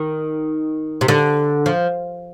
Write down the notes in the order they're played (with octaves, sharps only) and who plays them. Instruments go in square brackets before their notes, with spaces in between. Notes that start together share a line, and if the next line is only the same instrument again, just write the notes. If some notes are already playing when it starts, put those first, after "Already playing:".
Already playing: [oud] D#3
C3
D3
F3